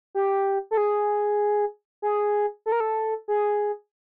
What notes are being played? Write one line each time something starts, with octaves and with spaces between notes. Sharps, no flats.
G4
A4
G#4
G#4
A4
A#4
A4
G#4